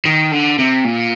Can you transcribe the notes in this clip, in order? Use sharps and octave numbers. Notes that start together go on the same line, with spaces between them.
D#3
D3
C3
A#2